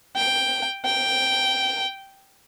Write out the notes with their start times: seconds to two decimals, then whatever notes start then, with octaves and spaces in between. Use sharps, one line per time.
0.16 G5
0.85 G5